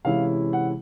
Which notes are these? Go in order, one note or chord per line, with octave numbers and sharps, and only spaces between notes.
C3 E3 G#3 C#4 E4 F5
F#5